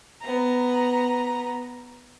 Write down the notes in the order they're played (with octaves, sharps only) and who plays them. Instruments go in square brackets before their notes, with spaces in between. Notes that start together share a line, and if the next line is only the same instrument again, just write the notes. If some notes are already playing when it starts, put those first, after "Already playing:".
[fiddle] B3 A#5